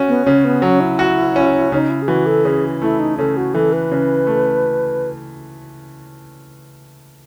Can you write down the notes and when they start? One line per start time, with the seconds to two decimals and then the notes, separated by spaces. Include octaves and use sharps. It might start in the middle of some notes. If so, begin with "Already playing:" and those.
Already playing: C#4 F#4
0.08 B3
0.25 C#3 C#4
0.44 B3
0.62 F#3 C#4
0.80 E4
0.99 F#4
1.36 C#4
1.72 C#3 D#4
1.90 E4
2.02 G#4
2.08 E3 F#4
2.26 A4
2.45 C#3 G#4
2.82 A3 E4
2.99 D#4
3.18 C#3 A4
3.37 F#4
3.54 E3 A4
3.73 B4
3.92 C#3
4.27 A3